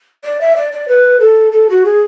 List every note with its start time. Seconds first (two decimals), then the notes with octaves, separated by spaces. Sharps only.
0.24 D5
0.41 E5
0.56 D5
0.72 D5
0.88 B4
1.20 A4
1.52 A4
1.69 F#4
1.85 G#4